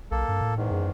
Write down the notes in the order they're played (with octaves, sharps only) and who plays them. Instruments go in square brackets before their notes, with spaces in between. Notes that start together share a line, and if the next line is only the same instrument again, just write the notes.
[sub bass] B1 [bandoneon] A#3 A4
[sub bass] G2
A2
[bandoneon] E2 G#2 D#3
[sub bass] F#2